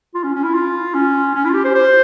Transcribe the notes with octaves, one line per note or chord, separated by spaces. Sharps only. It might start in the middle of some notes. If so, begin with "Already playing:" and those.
F4
C#4
C#4
E4
F4
C#4
C#4
E4
F4
G4
C5
C5